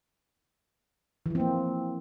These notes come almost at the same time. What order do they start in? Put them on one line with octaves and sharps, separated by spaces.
E3 F3 C4 A#3